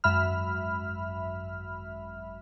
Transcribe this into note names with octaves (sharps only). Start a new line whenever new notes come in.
G#1 F#2 E5 B5 F6